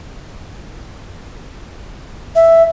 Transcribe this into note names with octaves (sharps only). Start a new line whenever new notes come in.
E5